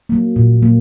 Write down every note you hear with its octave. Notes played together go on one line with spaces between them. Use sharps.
F#3 A#3
A#2
F#3 A#3